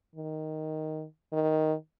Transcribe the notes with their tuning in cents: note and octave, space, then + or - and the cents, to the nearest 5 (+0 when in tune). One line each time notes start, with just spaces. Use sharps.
D#3 +5
D#3 +5